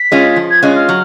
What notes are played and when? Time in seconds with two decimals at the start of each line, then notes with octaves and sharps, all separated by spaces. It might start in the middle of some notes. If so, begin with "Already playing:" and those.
Already playing: B6
0.12 G#3 C#4 F4
0.36 F3
0.50 G#6
0.62 G#3 C#4 F4 F#6
0.75 F6
0.89 F#3